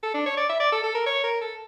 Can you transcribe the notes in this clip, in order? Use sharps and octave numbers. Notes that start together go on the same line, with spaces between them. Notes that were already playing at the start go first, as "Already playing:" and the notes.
A4
D4
C#5
D5
E5
D5
A4
A4
A#4
C#5
A#4
A4